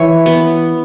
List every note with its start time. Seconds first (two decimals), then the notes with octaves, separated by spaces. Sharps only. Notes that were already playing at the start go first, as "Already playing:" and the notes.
Already playing: E3 C#5 E5
0.26 B3